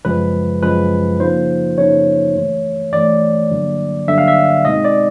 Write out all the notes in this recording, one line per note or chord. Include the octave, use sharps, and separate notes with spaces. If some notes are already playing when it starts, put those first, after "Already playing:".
F#2 C#3 F3 G#3 B4
F#2 C#3 F3 G#3 B4
C#3 F3 A#3 D#4 C5
C#3 F3 A#3 D#4 C#5
G2 E3 A3
G2 E3 A3 D5
G2 D3 F#3 A#3
G2 D3 F#3 A#3 E5
F5
E5
B2 G#3 C4 D#4 D#5
D5